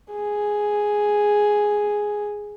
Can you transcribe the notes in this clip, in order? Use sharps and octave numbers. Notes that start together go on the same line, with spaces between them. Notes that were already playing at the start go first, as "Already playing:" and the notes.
G#4